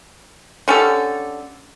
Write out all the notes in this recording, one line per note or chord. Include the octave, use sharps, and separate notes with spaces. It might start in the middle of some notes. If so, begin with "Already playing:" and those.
D3 C#4 G4 A4